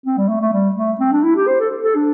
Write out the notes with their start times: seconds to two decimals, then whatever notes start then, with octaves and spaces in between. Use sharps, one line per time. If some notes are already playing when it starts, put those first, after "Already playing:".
0.06 C4
0.18 G3
0.29 A3
0.41 A3
0.53 G3
0.76 A3
1.00 C4
1.12 D4
1.23 E4
1.36 G4
1.47 C5
1.60 A4
1.84 A4
1.95 D4